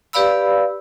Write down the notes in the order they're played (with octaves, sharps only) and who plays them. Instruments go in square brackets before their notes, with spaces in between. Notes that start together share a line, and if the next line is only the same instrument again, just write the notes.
[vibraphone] G4 B4 D5 F5 B5 E6